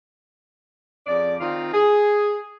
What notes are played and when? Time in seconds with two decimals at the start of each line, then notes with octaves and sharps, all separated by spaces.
1.07 F2 C#3 D5
1.41 D#3 C4 F4
1.73 G#4